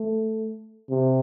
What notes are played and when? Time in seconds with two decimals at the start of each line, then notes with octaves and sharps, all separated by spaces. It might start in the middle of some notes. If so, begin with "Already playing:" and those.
Already playing: A3
0.90 C3